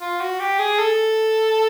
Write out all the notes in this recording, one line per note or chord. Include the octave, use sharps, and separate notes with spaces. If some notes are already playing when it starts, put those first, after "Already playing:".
F4
F#4
G4
G#4
A4